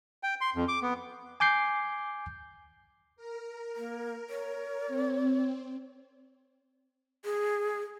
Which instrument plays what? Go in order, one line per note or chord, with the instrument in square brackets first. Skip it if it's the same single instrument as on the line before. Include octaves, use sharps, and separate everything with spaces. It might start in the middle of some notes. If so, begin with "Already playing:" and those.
[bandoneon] G5
C6
F2
D6
B3
[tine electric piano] G#5 D6 G6 C7
[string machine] A#4
[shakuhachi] A#3
C#5
[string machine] C4
[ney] G#4